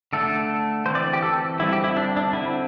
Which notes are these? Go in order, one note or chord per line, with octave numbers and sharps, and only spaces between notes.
D3 A3 D4 A4
E3 C4 C5
D5
G4
A4
D3 G3 C4 E4
G4
E4
D4
D4
D3 C4 E4